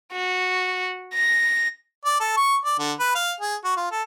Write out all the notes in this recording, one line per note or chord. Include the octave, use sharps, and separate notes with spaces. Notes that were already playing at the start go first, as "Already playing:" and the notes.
F#4
A#6
D5
A4
C#6
D5
D3
B4
F5
G#4
F#4
F4
A4